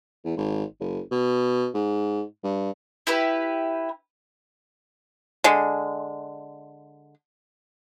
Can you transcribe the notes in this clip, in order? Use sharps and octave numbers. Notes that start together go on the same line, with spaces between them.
E2
G#1
F#1
B2
G#2
G2
E4 G4 B4
D3 G#3